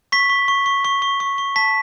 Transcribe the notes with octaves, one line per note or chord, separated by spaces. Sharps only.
C#6 B6
C#6
C#6
C#6
C#6
C#6
C#6
C#6
A5 B6